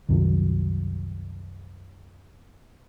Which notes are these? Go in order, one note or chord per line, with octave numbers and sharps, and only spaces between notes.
C2 F#2 D#3 F#3